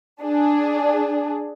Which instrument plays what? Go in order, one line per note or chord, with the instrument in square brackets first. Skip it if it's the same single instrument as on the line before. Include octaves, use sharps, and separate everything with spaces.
[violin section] D4 G#4